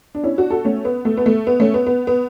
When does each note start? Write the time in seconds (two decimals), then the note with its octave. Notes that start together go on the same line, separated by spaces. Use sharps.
0.15 D4
0.24 C#4 E4
0.37 D4 F#4
0.50 F#4 A4
0.65 A3 C#4
0.85 B3
1.05 A3
1.17 B3
1.26 A3
1.47 B3
1.60 A3 C#4
1.74 B3
1.86 B3
2.07 B3